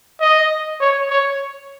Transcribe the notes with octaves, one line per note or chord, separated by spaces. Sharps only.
D#5
C#5
C#5